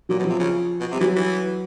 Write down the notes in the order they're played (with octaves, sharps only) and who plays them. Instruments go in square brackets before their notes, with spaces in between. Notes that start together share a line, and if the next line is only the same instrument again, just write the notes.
[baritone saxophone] A#2 [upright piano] F#3
[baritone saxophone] B2
[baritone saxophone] C3 [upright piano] F3
[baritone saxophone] C#3
B2
[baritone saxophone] C3 [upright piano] G3
[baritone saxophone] E3 [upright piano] F#3
[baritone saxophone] E3